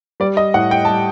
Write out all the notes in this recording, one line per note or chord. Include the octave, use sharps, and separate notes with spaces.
G3 D5
D#5
A2 F#5
G5
G3 A5